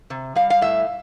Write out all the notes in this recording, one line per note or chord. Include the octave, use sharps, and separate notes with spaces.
C3
G3 F5
F5
A2 E5